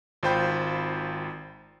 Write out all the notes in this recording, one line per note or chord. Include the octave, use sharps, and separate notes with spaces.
G#1 F4 C5 G5 B5 G6